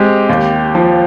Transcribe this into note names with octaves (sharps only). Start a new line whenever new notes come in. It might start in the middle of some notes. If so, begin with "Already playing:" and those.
Already playing: G#3 C4 G4
D#2
F3